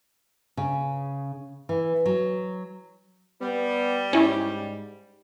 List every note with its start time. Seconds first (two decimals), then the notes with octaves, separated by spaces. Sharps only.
0.57 C#3
1.69 E3
2.06 F#3
3.41 G3 B3
4.13 G#2 C#4 E4